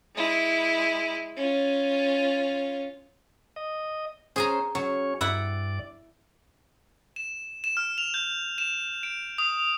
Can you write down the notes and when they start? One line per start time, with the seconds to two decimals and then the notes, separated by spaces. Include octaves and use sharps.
0.15 G#3 E4
1.36 C#4 F4
3.56 D#5
4.36 C#4 G#4 C5 G#5 A#5
4.75 F#3 C#4 C#5
5.21 G2 E4 D5 F#5
7.16 E7
7.64 E7
7.77 F6
7.98 F7
8.14 G6
8.58 E7
9.03 D7
9.38 D#6